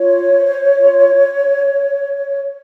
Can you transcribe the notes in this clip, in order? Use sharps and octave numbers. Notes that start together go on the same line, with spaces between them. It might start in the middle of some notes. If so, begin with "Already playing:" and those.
Already playing: F4 C#5
C5
F4